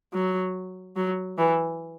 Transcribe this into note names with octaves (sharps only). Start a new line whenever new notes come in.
F#3
F#3
E3